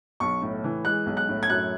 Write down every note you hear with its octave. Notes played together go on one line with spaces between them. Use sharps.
B1 C#6
A2
E3
G#3 F#6
B1
F#6
A2
G#6
F#2 F#6